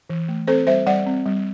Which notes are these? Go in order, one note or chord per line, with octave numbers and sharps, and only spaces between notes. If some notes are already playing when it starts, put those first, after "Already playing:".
E3
A3
C4 A4 C5
G3 C5 E5
G3 D5 F#5
C4
G3